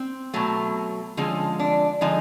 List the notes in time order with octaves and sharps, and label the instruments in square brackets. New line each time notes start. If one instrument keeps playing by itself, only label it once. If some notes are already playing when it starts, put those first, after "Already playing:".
Already playing: [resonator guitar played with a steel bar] C4
B2 F#3 A3
D3 F3 G#3 C#4
D4
D3 F3 G#3 D#4